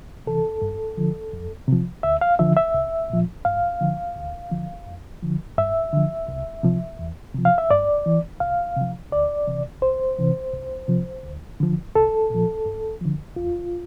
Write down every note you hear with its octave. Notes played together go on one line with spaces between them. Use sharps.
C3 E3 A4
G2
D3 F3
F2
C3 F3
D2 E5
F5
D3 F3 E5
E5
C2
A#2 F3
G2 F5
D3 F3
D2
D3 F3
F2
D3 F3
G2 E5
D3 F3
C2
C3 F3
E2
C3 F3
F5
E5
G2 D5
E3
C2 F5
C3 F3
D2 D5
C3 E3
C2 C5
C3 E3
C2
C3 F3
D2
D3 F3
C2 A4
A#2 F3
G2
D3 F3
E2 F4